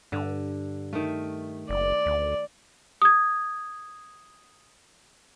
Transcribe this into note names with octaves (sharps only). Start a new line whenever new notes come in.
G2 D3
D#3 A3
F#1 D5
D2
D#6 G#6